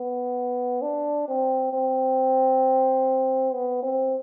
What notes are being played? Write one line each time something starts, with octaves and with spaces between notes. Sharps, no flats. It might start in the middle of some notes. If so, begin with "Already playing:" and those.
Already playing: B3
D4
C4
C4
B3
C4